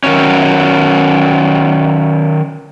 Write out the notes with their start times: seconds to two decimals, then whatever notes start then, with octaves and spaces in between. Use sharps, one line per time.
0.04 D#3 F#3 C#4